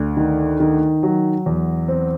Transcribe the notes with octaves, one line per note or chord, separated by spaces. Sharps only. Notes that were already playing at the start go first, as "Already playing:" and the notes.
Already playing: D2
D#3
D#3
F#3
E2
C4